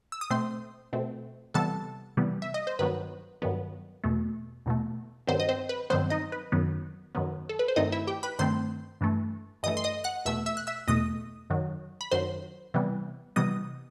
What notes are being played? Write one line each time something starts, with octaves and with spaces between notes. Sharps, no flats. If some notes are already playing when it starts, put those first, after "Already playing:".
E6
D#6
B2 A3 C4 C5 C6
B2 A3 C4
C3 E3 G3 B3 A4 A5
C3 E3 G3 B3
E5
D#5
C5
G2 D#3 F#3 B3 B4
G2 D#3 F#3 B3
E2 B2 A3
E2 B2 A3
G2 D#3 F#3 B3 C4 C5
D#5
C4 C5
B4
G2 D#3 F#3 B3 C4 C5
D#4 D#5
B4
F#2 D#3 F#3 B3
F#2 D#3 F#3 B3
A4
B4
C5
G2 D#3 A3 C4 D#4 D#5
E4 E5
G4 G5
B4 B5
G2 D#3 A3 C4 C5 C6
G2 E3 A3
G2 E3 A3 D#5 D#6
C6
D#5 D#6
F#5 F#6
E2 B2 A3 E5 E6
E5 E6
F#6
E5 E6
E2 B2 A3 D#5 D#6
F#2 D#3 F#3
B5
F#2 D#3 F#3 C5 C6
C3 E3 G3 B3
C3 E3 G3 B3 D#5 D#6